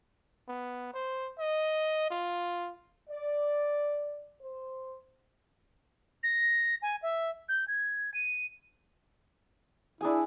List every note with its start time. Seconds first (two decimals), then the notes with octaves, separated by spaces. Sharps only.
0.48 B3
0.94 C5
1.39 D#5
2.10 F4
3.09 D5
4.41 C5
6.23 A#6
6.82 G#5
7.02 E5
7.49 G6
7.68 G#6
8.14 D#7
10.01 D4 E4 G#4 G#5